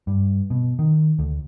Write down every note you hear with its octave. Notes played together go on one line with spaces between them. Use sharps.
G2
B2
D#3
D2